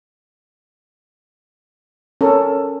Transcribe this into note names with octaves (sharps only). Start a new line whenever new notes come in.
C#4 A4 A#4